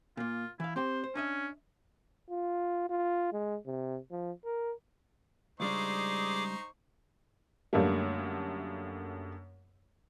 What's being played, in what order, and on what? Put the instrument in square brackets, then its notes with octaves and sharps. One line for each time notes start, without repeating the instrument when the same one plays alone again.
[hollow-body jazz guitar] A#2 A#3 [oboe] F4
[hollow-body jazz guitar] E3 F5 [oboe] E4
[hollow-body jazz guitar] C4 G4 G5 [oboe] C5
[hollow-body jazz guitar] C5
[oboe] C#4 [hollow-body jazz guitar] D4 D#5 E5
[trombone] F4
F4
G#3
C3
F3
A#4
[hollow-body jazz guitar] C#2 G3 D4 [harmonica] D#4 C5 C#6 [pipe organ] G#4 D6
[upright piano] F#2 D3 G3 A3 A#3